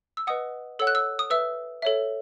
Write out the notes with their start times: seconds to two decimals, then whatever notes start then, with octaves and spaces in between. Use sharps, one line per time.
0.17 E6
0.27 B4 D#5 F#5 D#6
0.79 A4 C#5 F#5 E6
0.87 F#6
0.95 E6
1.19 D#6
1.30 B4 E5 E6
1.82 A4 C#5 E5